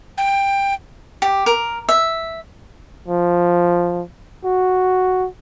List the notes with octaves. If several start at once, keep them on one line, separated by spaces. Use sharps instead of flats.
G5
G4
A#4
E5
F3
F#4